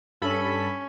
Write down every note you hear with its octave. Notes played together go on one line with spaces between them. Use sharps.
G2 C#4 A4 B5